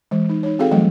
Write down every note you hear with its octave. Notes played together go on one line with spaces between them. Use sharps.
E3 G#3
D#4
D#4 C#5
C4 F#4 G#4 A4 F5 G5
E3 F#3 G3 A3 G5